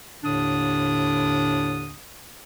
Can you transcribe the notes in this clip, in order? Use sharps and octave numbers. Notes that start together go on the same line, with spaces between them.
D#2 A2 D3 D4 D#6